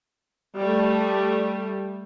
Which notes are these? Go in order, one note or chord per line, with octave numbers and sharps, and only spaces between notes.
G3 A3